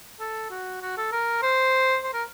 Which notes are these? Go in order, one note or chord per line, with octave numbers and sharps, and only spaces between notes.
A4
F#4
F#4
A4
A#4
C5
C5
A#4